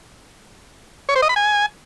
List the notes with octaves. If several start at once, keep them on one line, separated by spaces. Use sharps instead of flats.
C#5
C5
D#5
B5
G#5